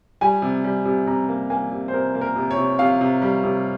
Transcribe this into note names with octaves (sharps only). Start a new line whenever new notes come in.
G3 G#5
C3
G3
C3
C3 A#5
A#3
A#3 G#5
C3
C5
C3 A#4
A#3
A#4
C3
C#5
C3
C3 F5
C3
G3
C3